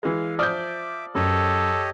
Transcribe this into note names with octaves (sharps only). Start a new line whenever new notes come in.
E3 G#3 F5
F3 D5 E5 D6 D#6 F6 G6
F#2 G4 A4 C#5 D#5